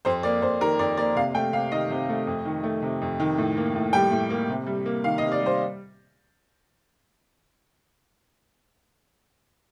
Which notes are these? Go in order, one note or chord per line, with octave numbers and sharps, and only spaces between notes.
F2 C5
A#3 D5
F2 C5
D#3 A#4
F2 D5
A#3 D5
C3 F5
A3 G5
C3 F5
D#3 D#5
C3
A3
F2
D#3
A3
C3
F2
D#3
A2
A#3
A2
G3 G5
A2
A#3
C3
G3
A#3
D#3 F5
D#5
C3
D5
G3
C5